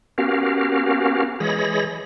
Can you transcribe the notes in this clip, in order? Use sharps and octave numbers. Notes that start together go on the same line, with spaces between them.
B3 C#4 F#4 G4 A#4 F5
E3 G#3 G#4 C#5 B5 A#6